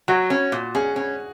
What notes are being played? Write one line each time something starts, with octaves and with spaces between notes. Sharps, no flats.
F#3 F#4
C#4
A#2
C#4 G#4
C#4